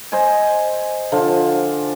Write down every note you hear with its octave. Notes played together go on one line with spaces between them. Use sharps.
C5 D#5 G#5
D3 F3 F4